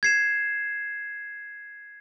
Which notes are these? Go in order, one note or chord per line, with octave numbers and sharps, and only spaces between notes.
G#6 C7 E7